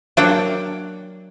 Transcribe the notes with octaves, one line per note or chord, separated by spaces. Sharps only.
F#3 A#3 D4 F#5 G5